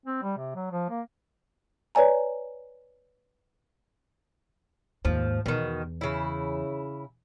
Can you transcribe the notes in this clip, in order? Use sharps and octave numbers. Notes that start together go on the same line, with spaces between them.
C4
G3
C3
F#3
F3
A#3
B4 C#5 D5 G#5 A#5
D#2 G#2 F3
E2 B2 D#3
C#3 E4